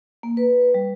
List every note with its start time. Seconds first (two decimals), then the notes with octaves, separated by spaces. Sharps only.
0.23 A#3
0.37 B4
0.74 G3